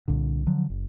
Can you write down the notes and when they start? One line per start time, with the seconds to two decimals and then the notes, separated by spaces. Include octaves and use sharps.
0.08 C2 A#2 D3
0.47 D3 F3 F#3
0.70 F#1